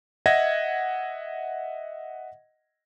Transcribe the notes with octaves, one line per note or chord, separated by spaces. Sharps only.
D#5 E5 F#5 G#6 A#6